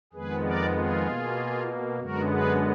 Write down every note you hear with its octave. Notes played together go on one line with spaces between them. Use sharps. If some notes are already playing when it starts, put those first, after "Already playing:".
F2 D#3 G#3 B3 G#4 B4
A#4 D5
F4 G#4
B2 A#3
F#2 D3 G#3 B3 F#4 A#4
G#4 B4